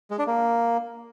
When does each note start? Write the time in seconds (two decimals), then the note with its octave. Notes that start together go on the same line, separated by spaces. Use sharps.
0.11 G#3
0.19 D4
0.27 A#3